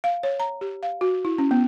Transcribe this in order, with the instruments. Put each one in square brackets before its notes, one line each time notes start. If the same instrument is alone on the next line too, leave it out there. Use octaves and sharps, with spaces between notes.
[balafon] F5
C#5
A#5
G4
F5
F#4
E4
C#4
B3